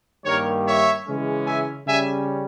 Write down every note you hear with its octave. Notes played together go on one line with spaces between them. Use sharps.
G2 D#3 G3 A#3 A#4 C#5
C#5 E5
C#3 E3 G#3 C#4
E5 G#5
C#3 G3 C#4 E5 G#5